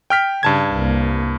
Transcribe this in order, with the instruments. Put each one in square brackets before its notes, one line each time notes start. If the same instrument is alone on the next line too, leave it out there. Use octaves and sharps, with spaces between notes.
[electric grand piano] G5 F6 B6
[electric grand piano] G2 A5 G#6 [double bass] C#3
[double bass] C2 A#3